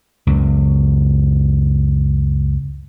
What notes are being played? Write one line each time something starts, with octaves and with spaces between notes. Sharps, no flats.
C#2 F#2